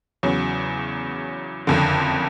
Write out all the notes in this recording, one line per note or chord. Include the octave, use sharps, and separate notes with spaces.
E2 C#3 F#3
F#1 F2 D3